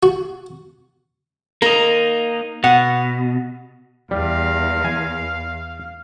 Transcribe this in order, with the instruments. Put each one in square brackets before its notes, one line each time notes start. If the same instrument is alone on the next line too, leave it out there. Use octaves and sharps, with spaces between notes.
[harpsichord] F#4
[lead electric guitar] A#3 D#4 [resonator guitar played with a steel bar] A#4
[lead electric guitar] B2 [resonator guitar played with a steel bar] F#5
[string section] E2 [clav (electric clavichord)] G3 [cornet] F5
[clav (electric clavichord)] G#5